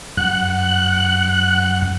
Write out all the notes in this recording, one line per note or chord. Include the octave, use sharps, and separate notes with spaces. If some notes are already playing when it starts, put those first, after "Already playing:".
F#2 F#5 F#6